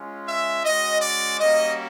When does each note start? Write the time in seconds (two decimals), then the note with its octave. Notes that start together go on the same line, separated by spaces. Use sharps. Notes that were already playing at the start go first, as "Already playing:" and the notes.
Already playing: G#3 C#4 F4
0.27 E5
0.64 G#3 C#4 F#4 D#5
1.02 D5
1.39 G3 A#3 C#4 F#4 D#5